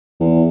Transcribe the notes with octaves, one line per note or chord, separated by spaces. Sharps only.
E2